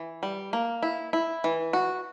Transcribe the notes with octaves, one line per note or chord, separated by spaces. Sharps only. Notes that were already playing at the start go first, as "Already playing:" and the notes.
Already playing: E3
G3
A#3
E4
E4
E3
F#4